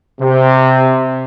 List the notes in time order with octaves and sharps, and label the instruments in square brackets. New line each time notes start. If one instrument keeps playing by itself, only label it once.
[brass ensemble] C3